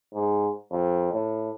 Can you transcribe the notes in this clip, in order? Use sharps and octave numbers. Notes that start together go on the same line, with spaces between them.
G#2
F2
A2